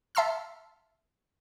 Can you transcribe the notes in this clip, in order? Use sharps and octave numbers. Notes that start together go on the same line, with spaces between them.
E5 A5 C6 E6 F6